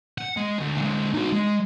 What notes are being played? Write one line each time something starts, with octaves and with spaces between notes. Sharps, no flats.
F#5
G#3
D2
D3 G#3
D#4 F#4
G#3